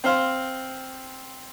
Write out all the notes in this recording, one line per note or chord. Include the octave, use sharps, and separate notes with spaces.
C4 C5 F5